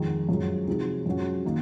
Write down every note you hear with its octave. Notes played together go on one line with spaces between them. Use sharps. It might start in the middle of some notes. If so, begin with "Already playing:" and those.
Already playing: F2 D#3 G#3
F#2 F3 G#3
C3 F3 G#3 D#4 F#4
F#2 F3 G#3 C#4 F#4
D#3 A#3 D#4